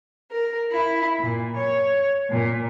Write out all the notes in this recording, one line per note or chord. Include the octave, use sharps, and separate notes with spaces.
A#4
E4
A#2
C#5
A#2